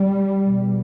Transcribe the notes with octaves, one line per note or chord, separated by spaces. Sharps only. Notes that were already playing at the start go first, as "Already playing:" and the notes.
Already playing: G3
E2 B2